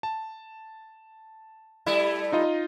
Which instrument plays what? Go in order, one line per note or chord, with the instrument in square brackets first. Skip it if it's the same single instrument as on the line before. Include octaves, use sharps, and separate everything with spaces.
[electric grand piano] A5
[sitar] G3 A3 E4
[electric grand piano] D#4 F4 D#5